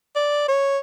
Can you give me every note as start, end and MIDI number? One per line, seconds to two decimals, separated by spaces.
0.16 0.46 74
0.48 0.78 73